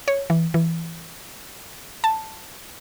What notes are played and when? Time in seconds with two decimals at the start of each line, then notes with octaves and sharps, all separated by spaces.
0.08 C#5
0.30 E3
0.54 E3
2.04 A5